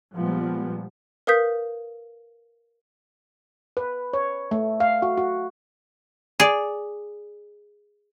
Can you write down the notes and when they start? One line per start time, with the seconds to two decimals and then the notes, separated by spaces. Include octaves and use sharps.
0.15 A#2 F3 G3 G#3 B3
1.27 A#4 B4 F5 D#6 G6 B6
3.77 B4
4.13 C#5
4.51 A3
4.80 F5
5.02 F#4
5.17 F#4
6.40 G#4 D5